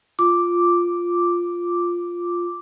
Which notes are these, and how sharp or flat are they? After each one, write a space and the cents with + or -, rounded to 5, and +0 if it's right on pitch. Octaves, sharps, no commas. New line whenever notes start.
F4 +0 D6 +0